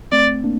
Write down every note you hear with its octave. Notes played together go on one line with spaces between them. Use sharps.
A3 C4 D5
A#3 D4